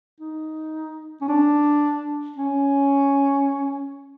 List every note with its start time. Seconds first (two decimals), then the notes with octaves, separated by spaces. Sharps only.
0.20 D#4
1.22 C#4
1.29 D4
2.37 C#4